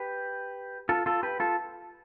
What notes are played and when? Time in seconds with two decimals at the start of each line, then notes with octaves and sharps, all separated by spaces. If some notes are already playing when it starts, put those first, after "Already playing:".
Already playing: G4 B4
0.89 F4 A4
1.06 F4 A4
1.23 G4 B4
1.40 F4 A4